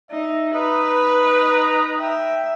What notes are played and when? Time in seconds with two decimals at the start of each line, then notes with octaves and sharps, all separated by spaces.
0.11 D#4 E5
0.54 D#4 B4
0.88 A#5
1.50 A#5
1.99 E5 G5